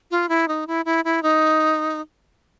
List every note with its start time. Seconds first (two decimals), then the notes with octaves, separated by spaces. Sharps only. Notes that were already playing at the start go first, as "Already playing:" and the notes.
0.11 F4
0.29 E4
0.48 D#4
0.67 E4
0.85 E4
1.05 E4
1.23 D#4